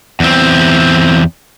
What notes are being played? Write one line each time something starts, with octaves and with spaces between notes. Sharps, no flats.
E2 C4